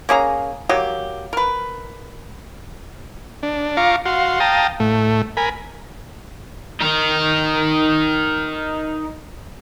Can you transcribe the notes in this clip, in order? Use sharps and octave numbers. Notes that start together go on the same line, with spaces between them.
A#3 C#4 G#4 A#5
F#3 A#3 G4
A#4 B4
D4
F4 F5 A#5 C#6 D6
F#4 F5 C6
F5 G5 A5 A#5 D#6
A2 A3
A#4 G#5 B5
D#4 A#4